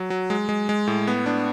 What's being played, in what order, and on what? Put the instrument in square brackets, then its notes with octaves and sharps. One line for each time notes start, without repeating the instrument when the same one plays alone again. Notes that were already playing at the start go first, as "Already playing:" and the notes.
Already playing: [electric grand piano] F#3
F#3
G#3
G#3
G#3
A2
B3
D4